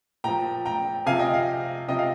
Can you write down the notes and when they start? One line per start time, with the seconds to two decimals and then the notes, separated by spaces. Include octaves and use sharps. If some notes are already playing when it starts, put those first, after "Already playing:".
0.24 A#2 F3 G5 A#5
0.65 G5 A#5
1.06 C3 F3 F5 G#5
1.19 D#5 G5
1.34 F5
1.88 C3 F3 D#5 G5
1.99 F5